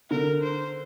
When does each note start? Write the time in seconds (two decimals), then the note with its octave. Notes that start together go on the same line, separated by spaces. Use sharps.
0.10 D3 A#4
0.43 C5